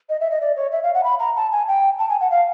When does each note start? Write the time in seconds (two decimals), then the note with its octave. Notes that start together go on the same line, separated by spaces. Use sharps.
0.09 D#5
0.21 E5
0.31 D#5
0.41 D5
0.56 C#5
0.72 E5
0.83 F5
0.94 F#5
1.04 B5
1.19 A#5
1.36 A5
1.52 G#5
1.68 G5
1.99 A5
2.09 G#5
2.21 F#5
2.31 F5